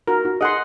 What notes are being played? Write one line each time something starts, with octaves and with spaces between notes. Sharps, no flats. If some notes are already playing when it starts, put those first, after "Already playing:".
F#4 A#4
F#4
G#4 D#5 F#5 C6